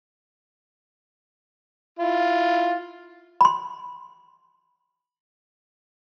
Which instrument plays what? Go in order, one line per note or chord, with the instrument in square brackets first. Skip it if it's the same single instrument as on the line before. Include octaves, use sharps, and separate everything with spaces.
[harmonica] E4 F4
[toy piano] B5 C6